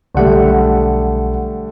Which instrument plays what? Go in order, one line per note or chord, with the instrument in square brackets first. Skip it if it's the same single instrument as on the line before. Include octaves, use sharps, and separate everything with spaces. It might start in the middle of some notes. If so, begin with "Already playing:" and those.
[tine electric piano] B1 F#5 [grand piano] D3 G3 A3